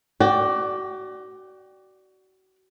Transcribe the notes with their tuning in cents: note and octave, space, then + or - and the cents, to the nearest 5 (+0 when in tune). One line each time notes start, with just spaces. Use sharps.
F#4 +30 D5 +0 G5 +0